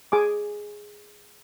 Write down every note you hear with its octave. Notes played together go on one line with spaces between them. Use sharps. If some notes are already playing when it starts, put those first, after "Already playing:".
G#4 G#5 D6